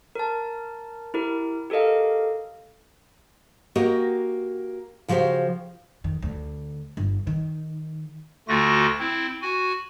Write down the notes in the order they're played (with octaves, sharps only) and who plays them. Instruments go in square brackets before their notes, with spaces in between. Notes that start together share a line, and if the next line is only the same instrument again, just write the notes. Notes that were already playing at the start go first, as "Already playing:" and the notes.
[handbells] A#4 A5
E4 G4 A#4
G4 A4 A#4 D#5 F5
[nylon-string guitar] A#3 F#4 G4 D#5
C#3 F3 F#4 G4 C5
[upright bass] F2 D#3
D2
G1
D#3
[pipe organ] D2 D3 A3 F4 F#4 A#6
C4 E4
F#4 G#5